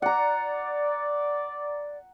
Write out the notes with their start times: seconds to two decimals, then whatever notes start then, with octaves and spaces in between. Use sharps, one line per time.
0.02 D5 F#5 A#5